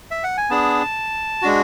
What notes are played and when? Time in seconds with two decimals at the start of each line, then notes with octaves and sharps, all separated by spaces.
0.11 E5
0.24 F#5
0.37 G#5
0.50 B3 D4 G#4 A5
1.42 G#3 D4 F#4